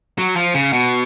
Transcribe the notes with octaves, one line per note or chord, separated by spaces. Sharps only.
F#3
F3
C#3
B2